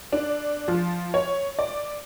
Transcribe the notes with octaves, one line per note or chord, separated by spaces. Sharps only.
D4
F3
C#5
D5